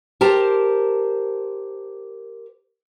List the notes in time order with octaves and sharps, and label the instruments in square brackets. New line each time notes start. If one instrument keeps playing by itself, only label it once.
[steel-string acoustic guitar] G4 A#4 C5 A5